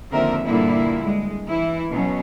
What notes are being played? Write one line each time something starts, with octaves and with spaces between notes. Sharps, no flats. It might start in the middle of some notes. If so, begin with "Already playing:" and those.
D#2 D3 F3 C4 A#4 E5
G2 A#2 D3 A#3 E4
G#3
E3 E4
B2 F#3 C#4